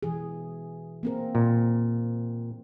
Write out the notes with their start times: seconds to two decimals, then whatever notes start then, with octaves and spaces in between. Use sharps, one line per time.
0.03 B2 E3 G#4
1.03 A#3 C4 A#4
1.35 A#2